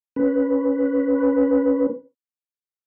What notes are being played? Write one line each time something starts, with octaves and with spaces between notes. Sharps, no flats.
C#4 B4